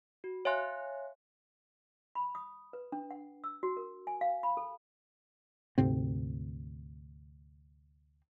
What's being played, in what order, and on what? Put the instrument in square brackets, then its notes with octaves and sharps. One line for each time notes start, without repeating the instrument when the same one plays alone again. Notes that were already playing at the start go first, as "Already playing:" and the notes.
[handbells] F#4
C#5 E5 F5 G#5 C6 F#6
[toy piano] B5
D#6
B4
D4
F#5
E6
F#4
A#4
G#5
F5
B5
A4
[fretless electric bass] D2 G#2 C3 C4